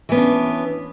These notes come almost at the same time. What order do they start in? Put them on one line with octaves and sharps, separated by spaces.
E3 B3 C#4 D4